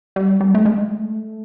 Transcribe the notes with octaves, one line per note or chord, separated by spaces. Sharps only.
G3
G3
A3
G#3
A3